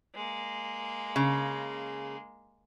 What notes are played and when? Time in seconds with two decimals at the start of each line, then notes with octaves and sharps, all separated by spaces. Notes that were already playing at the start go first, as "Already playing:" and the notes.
0.14 G#3 A#3
1.16 C#3